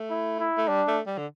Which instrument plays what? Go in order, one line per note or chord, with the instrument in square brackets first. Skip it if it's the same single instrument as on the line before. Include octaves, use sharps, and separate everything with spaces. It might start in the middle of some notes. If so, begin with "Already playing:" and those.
Already playing: [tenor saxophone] A3
[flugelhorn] E4
E4
[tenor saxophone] A3
[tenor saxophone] G3 [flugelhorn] D4
[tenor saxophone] A3
G3
D3